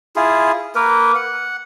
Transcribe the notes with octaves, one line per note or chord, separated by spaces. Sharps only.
E4 F4 G#4
A#3 A#4 B4
F#5